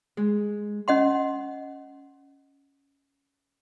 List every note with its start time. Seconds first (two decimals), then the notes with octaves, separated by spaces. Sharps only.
0.17 G#3
0.88 C#4 D#5 F#5 C6